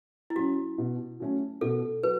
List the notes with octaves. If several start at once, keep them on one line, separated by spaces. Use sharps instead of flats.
E4
F#3 C#4 F#4
B2
F#3 A3 C#4
B2 A4
F#3 B4